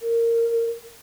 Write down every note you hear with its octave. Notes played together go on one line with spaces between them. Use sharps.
A#4